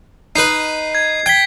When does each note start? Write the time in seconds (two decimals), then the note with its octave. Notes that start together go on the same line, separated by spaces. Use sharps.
0.36 D#4 B4 C7
0.95 G#6
1.26 G5 G#6 B6